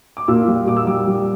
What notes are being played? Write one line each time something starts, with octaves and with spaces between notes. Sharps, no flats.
D6
A#2 E6
G3
A#2 D6
E6
G3 D6
G3